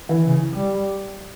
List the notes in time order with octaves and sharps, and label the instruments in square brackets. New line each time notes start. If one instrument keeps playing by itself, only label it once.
[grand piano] E3
[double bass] C#3
G3